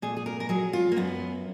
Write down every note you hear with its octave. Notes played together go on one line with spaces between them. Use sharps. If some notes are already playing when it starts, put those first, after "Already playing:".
A#2 G#4
G#4
A#4
A#4
F#3 G#4
F4
A#3
F#2 B3